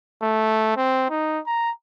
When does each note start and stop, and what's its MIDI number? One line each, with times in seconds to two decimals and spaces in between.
0.22 0.73 57
0.77 1.07 60
1.10 1.40 63
1.46 1.71 82